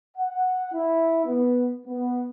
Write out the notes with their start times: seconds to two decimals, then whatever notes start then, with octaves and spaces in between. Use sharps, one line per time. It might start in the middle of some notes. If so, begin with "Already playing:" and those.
0.17 F#5
0.73 E4
1.25 B3
1.87 B3